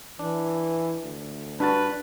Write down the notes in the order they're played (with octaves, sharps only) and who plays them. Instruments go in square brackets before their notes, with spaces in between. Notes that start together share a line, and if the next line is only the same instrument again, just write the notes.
[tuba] E3 [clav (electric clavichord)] D4
[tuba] D2
[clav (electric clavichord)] G2 F#4 A5 [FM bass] D4 [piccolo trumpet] B4